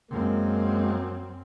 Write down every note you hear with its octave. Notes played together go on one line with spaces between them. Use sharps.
F#2 G#3 A#3 C4